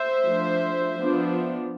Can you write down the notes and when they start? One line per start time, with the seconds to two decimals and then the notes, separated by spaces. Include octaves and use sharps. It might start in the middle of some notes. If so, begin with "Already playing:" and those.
Already playing: C5 E5
0.24 F3 A3 D4
0.96 F3 B3 D4